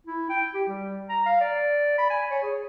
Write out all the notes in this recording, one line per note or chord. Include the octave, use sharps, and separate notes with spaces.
E4
G5
G4
G3
A#5
F5
D5
B5
G#5
C#5
G#4